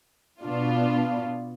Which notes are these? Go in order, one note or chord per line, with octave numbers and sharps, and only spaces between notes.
B2 B3 D4 F4